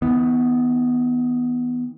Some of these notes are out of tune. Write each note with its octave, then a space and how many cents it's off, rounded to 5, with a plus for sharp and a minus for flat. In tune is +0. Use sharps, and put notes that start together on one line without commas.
D#3 +40 B3 +0